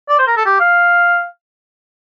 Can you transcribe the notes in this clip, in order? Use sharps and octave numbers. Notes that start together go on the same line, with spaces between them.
D5
C5
A#4
A4
G4
F5